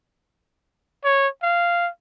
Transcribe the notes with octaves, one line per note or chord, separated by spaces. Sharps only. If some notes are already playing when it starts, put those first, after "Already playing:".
C#5
F5